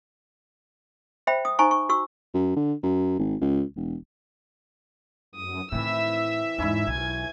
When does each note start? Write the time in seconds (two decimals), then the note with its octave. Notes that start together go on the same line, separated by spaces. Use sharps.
1.27 C5 E5 G5 B5
1.45 D#6
1.59 D#4 C5 G#5 A#5 C#6
1.71 C#6
1.89 F#4 C#6 E6
2.34 F#2
2.56 D3
2.83 F#2
3.19 G#1
3.41 C#2
3.76 E1
5.35 F#2 D#6
5.72 A2 C3 D#3 E3 E5 E6
6.58 E2 G#2 C#4 D#4 E4
6.87 B1 G#5 G#6